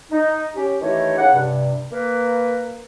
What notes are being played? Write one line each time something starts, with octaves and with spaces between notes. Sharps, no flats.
D#4
C#4 G4
D#3 E3 A3 D#4 G4 C#5
C#3 F#5
G2 C3
A#3 B4